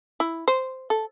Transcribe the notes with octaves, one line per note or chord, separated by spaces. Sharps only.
E4
C5
A4